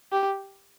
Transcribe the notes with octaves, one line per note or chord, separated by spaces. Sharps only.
G4